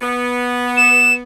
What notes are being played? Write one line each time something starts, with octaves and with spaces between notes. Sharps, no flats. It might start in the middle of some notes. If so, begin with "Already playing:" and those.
B3
E7